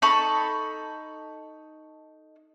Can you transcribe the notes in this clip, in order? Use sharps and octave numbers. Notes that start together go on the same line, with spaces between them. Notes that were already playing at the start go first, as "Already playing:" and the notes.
D#4 A4 B5 C#6